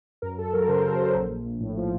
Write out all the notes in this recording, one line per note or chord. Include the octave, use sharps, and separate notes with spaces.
F#2 A#4
F#2 A4
F#3 A#4
C#3 C5
A#4
F#2
C5
F#3
A#1
A#1
A#1
A2
F3